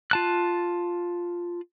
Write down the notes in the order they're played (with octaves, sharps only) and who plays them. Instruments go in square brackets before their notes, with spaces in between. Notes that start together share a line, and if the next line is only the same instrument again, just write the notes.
[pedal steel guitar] F4 A5 F#6